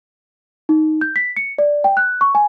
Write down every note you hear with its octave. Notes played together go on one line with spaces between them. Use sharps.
D#4
G6
B6
C#7
D5
G5
F#6
C#6
G#5